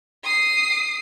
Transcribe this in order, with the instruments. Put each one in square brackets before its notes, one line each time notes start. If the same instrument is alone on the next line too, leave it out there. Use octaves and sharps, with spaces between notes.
[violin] D#6 C7